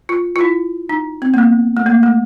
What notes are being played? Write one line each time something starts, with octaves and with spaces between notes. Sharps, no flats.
F4
F4
E4
D#4
C4
A#3
B3
A3
A#3
A3